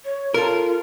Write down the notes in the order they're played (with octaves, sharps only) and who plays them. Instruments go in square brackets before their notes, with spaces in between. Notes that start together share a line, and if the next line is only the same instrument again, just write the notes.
[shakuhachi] C#5
[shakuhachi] F4 [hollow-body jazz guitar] A4 A#4